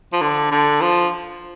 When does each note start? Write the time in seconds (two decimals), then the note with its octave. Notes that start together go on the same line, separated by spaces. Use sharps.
0.13 F3
0.21 D3
0.52 D3
0.81 F3